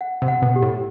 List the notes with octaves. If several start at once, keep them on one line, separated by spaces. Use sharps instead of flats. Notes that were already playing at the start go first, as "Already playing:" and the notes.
F#5
C3
F#5
B2
G4
A2